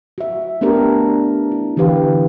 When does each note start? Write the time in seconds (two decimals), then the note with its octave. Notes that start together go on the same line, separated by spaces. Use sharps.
0.18 F#4 E5
0.61 A3 B3 D4 G4 A#4
1.52 E4
1.77 D3 E3 D4 G4 B4 F5